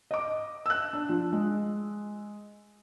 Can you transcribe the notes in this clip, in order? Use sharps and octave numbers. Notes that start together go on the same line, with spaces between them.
D#5 D6
E6 F#6
D4
F3
G#3